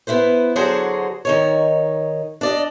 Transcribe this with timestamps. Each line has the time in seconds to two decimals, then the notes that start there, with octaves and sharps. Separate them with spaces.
0.07 B3 E4 B4 C5
0.56 D3 F#3 F#4 G#4 C5
1.25 D#3 D#4 C#5
2.41 D4 D5 D#5